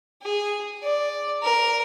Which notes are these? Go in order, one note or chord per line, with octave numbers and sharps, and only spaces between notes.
G#4
D5
A#4